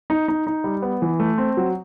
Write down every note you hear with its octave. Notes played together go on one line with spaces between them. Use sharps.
D#4
D#4
D#4
G3
B3
E3
A3
C4
F#3